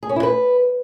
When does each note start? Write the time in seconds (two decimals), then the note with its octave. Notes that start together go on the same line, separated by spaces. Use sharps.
0.03 G#4
0.09 C#4
0.16 E4
0.23 B4